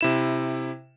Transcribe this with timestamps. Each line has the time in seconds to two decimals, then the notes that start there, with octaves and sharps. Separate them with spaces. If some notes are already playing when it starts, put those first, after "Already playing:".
0.01 C3 E4 E7